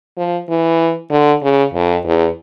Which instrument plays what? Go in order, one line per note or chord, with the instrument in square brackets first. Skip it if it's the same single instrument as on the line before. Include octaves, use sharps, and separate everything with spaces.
[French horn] F3
E3
D3
C#3
F2
E2